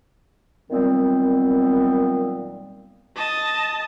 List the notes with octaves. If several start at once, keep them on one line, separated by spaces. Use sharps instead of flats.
A#2 D#3 F#3 G3 B3 C4
D#5 A5